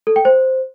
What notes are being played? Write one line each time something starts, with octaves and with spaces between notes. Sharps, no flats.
A4
G5
C5